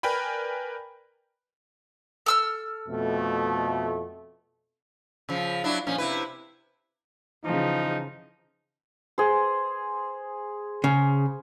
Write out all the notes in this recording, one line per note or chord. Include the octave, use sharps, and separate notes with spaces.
A#4 B4 D5 G5 G#5 B5
A4 E6 F6
F2 B2 A3
C#3 F3
F#3 D4 E4
A#2 F3 C#4
C3 E4 B4
C#3 E3 F3 D#4
G#4 C5
C#3